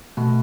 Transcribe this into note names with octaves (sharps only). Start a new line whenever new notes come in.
B2 A3